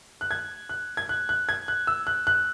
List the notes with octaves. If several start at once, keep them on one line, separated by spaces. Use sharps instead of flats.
F#6
G#6
F#6
G#6
F#6
F#6
G#6
F#6
E6
F#6
F#6